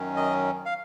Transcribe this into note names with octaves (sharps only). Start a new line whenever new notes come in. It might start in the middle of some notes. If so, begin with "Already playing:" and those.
Already playing: F#2 D#3 F#3 C#4
D#5
F5